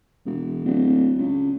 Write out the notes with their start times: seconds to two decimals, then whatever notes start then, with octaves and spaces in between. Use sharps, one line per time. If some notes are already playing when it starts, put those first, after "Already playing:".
0.26 E1
0.65 D1
1.18 C#2